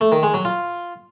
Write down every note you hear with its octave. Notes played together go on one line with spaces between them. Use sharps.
A3
D#3
G#3
F#3
F4